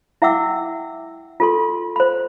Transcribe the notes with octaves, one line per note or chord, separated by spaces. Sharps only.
E4 E5 F#5 G5 D6 E6
F4 A4 C6
C5 B5